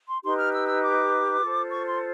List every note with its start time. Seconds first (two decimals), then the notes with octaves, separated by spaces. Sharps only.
0.09 C6
0.23 D#4 G4 B4 C6
0.38 F6
0.53 E6
0.68 E6
0.82 D6
1.42 F4 A4 C5
1.71 C#6
1.86 C6